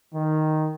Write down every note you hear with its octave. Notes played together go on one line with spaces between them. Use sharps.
D#3